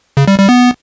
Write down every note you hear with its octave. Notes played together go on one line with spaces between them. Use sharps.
C#3
G3
G3
B3